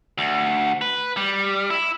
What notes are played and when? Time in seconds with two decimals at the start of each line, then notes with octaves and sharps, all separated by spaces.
0.18 D2
0.81 B4
1.17 G3
1.70 E4